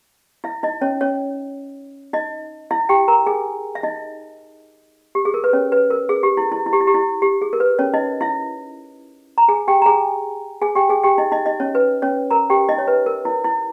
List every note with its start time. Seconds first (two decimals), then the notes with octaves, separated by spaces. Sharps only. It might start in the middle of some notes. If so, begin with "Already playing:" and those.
0.44 E4 E5
0.63 D#4 D#5
0.81 C#4 C#5
1.01 C#4 C#5
2.13 D#4 D#5
2.71 E4 E5
2.89 G4 G5
3.08 A#4 A#5
3.26 G#4 G#5
3.75 E5
3.83 D#4 D#5
5.15 G4
5.25 G#4
5.34 A#4
5.44 B4
5.53 C#4 C#5
5.72 B4
5.90 A#4
6.09 G#4
6.23 G4
6.37 E4
6.52 E4
6.66 E4
6.73 G4
6.81 E4
6.87 G4
6.94 E4
7.22 G4
7.42 G#4
7.53 A#4
7.60 B4
7.79 C#4 C#5
7.94 D#4 D#5
8.21 E4 E5
9.38 A#5
9.48 G#4 G#5
9.68 G4 G5
9.82 A#5
9.86 G#4 G#5
10.62 G#4 G#5
10.75 G4 G5
10.90 G#4 G#5
11.03 G4 G5
11.18 D#4 D#5
11.32 D#4 D#5
11.46 D#4 D#5
11.60 C#4 C#5
11.75 B4
12.02 C#4 C#5
12.30 A#4 A#5
12.50 G4 G5
12.69 D#4 D#5
12.78 C#5
12.88 B4
13.06 A#4
13.25 E4
13.44 E4